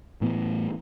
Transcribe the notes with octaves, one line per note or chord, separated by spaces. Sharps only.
A2 E3 B3